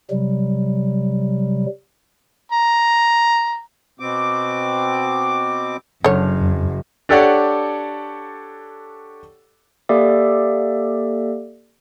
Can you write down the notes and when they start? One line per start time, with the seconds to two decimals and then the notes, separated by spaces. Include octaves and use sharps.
0.10 C3 F#3 G3
2.52 A#5
4.00 B2 C4 D6
6.05 F#1 F#2 D3 C#5 F6
6.41 F2
7.09 D4 G4 A4 C#5 D5 F#5
9.89 A#3 G4 A4 D5 E5